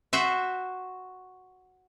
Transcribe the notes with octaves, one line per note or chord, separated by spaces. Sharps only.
F#4 C5 E5